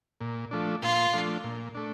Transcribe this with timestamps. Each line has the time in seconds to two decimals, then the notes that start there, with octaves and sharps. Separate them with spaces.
0.21 A#2
0.51 F3 A3 D4
0.82 A#2 F4
1.13 F3 A3 D4
1.44 A#2
1.75 A3 D4